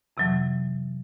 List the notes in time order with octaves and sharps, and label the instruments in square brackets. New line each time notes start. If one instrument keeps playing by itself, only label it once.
[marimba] F2 C3 E3 F#3